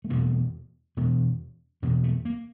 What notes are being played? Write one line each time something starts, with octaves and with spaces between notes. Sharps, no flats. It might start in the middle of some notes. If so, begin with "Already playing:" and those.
A3
E2 B2 A#3
E2 B2 B3
E2 B2 A#3
A3
A#3